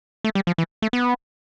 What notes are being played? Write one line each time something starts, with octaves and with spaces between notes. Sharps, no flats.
A3
G3
F3
E3
A3
B3